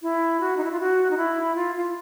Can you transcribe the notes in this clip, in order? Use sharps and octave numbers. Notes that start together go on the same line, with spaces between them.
E4
F#4
D#4
E4
F4
F#4
D#4
E4
F4
F4